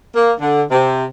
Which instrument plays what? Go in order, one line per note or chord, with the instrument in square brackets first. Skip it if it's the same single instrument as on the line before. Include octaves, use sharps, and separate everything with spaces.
[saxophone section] A#3
D3
C3